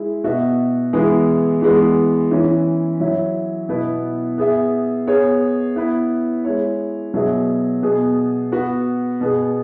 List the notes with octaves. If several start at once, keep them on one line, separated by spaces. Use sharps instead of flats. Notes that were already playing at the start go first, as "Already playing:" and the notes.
Already playing: G#3 E4 G#4
B2 B3 F#4 E5
E3 G#3 B3 E4 G#4
E3 G#3 B3
E3 C#4 E4
F#3 E4 C#5 E5
B2 B3 E4 B4
B3 G#4 E5
B3 G#4 C#5
B3 E4 B4
G#3 E4 C#5
B2 F#3 B3 G#4 E5
B2 B3 G#4
B3 F#4 B4
B2 B3 G#4